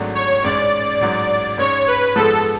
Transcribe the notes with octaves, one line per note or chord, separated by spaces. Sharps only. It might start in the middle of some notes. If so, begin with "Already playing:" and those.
Already playing: G#1 G#2 F#3 A3 D4
C#5
A1 G#2 G#3 C#4 D5
A1 G#2 F#3
G#2 G#3 C#4 C#5
B4
G#2 F3 G#3 B3 A4